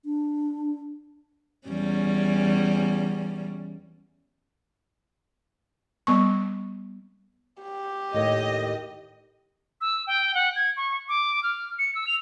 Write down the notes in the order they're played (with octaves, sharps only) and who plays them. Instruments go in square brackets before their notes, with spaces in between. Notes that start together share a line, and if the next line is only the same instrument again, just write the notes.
[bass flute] D4
[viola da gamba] E2 G3 C#4
[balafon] G3 B3 C#6
[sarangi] G4
[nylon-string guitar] D#2 A2 D#3 [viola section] D#5
[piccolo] E6
G5
F#5
G#6
C#6
D6
F6
C#7
E6
F7